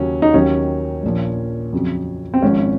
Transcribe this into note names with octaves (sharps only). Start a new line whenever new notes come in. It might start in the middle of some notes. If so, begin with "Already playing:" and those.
Already playing: D#2 C#3 F#3 C#4
D#4
D#2 D#3 F#3 C#4
A#1 A#2 F3
F2 C#3 F#3
C4
G#1 G#2 F3 C#4